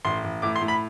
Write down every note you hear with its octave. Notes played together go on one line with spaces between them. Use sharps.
A1 C6
A1
A2 D6
C6
A2
B5